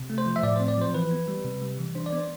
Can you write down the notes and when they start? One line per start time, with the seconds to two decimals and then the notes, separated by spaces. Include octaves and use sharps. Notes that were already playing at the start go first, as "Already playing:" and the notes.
Already playing: C3
0.10 A3
0.18 C5
0.26 F3
0.36 E5
0.43 A2 D5
0.56 C5
0.60 C4
0.68 D5
0.78 F3 C5
0.94 E3 B4
1.11 B3
1.28 G3
1.45 C3
1.61 G3
1.79 E3
1.95 D4 C5
2.06 D5
2.13 B3 C5